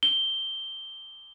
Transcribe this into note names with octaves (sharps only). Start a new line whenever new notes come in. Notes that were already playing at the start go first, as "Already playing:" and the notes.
G7